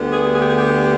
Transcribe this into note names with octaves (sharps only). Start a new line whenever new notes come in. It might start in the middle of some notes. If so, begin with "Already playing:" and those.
Already playing: D2 D3 G3 B3
G#4
G#4
G4
G#4
G4